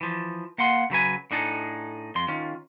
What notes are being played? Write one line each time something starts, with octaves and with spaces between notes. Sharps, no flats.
E3 F3
A#3 F5 F#5 C6
C#3 F#3 B4 G#5
A2 D4 D#4 G#4 A4
F2 C6
D#3 C#4 F4